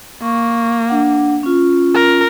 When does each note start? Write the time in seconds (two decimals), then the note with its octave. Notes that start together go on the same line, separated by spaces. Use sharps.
0.22 A#3 C#6
0.89 D4 F#5
1.43 C#4 F4
1.94 A#4